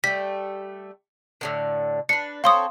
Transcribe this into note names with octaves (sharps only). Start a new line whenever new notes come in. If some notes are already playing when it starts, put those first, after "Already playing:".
G3 A3 B6
A2 D3 D#3
D4 B4 C#7
C4 A4 C#5 F5 C6 D#6